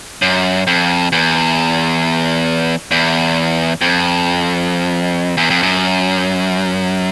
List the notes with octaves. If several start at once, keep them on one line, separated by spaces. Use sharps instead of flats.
F#2
F2
E2
E2
F2
E2
F2
F#2